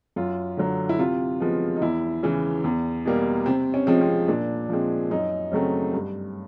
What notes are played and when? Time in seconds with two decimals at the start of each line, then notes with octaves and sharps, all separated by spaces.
0.16 F#2 F4
0.57 D3 F#3
0.89 E4
0.98 C3 F4
1.40 F3 G#3 B3
1.76 D#4
1.82 E2 E4
2.23 C#3 E3
2.64 E2
3.05 B2 G3 A#3
3.46 C3 C4
3.74 C#4
3.87 F3 G#3 C4
4.01 C4
4.28 A#2 D4
4.69 F3 G#3 C4
5.10 F#2 D#4
5.52 C#3 F#3 A3 C4
5.93 G2